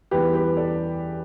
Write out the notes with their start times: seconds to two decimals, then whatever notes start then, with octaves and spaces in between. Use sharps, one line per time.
0.11 E2 E3 G3 G4 B4
0.34 G4 B4
0.57 A4 D5